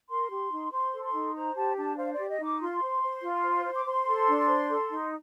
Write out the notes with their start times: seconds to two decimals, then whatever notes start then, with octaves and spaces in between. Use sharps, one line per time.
0.09 A#4 C6
0.30 G4
0.51 D#4
0.72 C5 C6
0.93 A4
1.03 C6
1.13 D#4
1.35 C5 A#5
1.56 G4 A5
1.77 D4 A5
1.97 C5 F5
2.13 D5
2.18 G4
2.29 D#5
2.40 D#4 D6
2.60 F4 C6
2.81 C5
3.02 C5
3.23 F4
3.43 C5
3.64 C5
3.75 D6
3.86 C5 C6
4.07 A4
4.28 D4
4.48 C5
4.70 A4
4.91 D#4